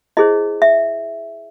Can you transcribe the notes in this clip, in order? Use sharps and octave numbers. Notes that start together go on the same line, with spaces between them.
E4 G#4 C5 D#5
E5